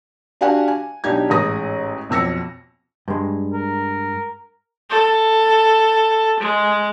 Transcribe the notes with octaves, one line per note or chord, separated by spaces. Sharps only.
D4 F#4 G4 F5 F#5 G#5
G#5
B1 D4 D#4 G4 G#6
A1 G#2 G#4 D#6 A#6
B1 F2 E6 A#6 C#7
G2 G#3
A#4
A4
G#3